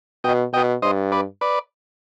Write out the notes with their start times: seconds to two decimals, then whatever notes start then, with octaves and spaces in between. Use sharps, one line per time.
0.24 B2 D#5 G5
0.53 B2 D#5 G5
0.82 G2 C5 D#5
1.12 B4 D5
1.41 B4 D5